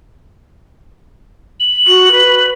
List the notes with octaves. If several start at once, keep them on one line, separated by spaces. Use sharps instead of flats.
F#7
F#4
B4